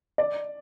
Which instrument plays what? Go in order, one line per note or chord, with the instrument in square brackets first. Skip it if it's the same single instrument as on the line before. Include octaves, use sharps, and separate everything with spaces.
[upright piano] D5